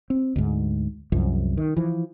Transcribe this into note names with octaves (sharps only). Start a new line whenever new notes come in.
C4
D2 G#2
C2 F#2 F3
D#3
E3 F3